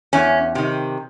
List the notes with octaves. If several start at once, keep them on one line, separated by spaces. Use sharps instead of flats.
E2 C#4
C3 D#3